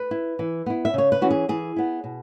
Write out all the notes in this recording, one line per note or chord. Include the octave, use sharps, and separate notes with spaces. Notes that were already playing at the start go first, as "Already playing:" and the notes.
Already playing: B4
E4
E3
B3 E4
E5
C#3 C#5
B4
E3 C#4 F#4
G#4
E3 G#4
B3 E4
B2